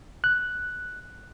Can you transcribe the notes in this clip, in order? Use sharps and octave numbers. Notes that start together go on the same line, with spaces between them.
F#6